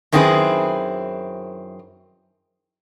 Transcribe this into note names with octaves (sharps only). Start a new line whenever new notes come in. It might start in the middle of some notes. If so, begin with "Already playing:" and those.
F#2 D#3 C4 E4 G#4 B4